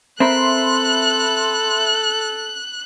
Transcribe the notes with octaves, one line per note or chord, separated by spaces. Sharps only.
C4 A4 A#4 E5 B5 C6 F#6